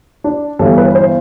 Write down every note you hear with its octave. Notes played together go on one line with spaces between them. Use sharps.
D4
G1 G2 E3 A4
B4
C5